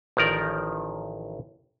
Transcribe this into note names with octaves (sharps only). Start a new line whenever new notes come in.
A1 D#3 F3 A#4 D5